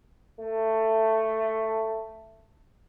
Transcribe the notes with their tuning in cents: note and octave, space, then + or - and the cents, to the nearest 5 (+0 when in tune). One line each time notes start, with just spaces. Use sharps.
A3 +10